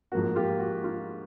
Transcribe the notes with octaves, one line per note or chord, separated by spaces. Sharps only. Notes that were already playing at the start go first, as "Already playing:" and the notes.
G#2 F3 A#3 F#4
F4 G4
F#4
F4